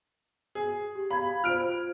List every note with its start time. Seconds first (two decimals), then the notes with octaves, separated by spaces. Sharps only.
0.55 G#4
0.95 G4
1.11 F5 B5 G#6
1.44 F4 C5 F6 D7